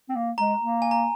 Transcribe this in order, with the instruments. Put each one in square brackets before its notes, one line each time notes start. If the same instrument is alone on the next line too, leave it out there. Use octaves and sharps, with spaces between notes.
[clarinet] C4
A#3
[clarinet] G#3 [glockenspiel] A#5
[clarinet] A#3
[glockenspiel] G#5
A#5